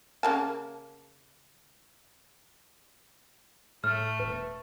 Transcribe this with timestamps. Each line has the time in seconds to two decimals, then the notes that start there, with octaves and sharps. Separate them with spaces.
0.23 C#3 A#3 A5
3.84 A2 A3 F6
4.19 E1 B4